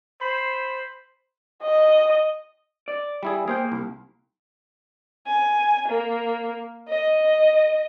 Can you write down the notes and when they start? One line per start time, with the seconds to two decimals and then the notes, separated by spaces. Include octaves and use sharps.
0.21 C5 B5
1.63 D#5
2.88 D5
3.23 G3 E4 G#4
3.48 A#3 G#4 C5 G5
3.72 C2
5.27 G#5
5.88 A#3
6.88 D#5